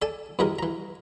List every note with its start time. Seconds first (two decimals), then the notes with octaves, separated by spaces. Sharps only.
0.02 A4 D5 G#5 A5
0.39 F#2 D#3 E3 G3 G#4 A#4
0.59 E3 A#5